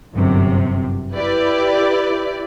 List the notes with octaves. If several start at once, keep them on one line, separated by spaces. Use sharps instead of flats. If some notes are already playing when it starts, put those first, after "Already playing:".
G1 F#2 C3
E4 G4 B4 D5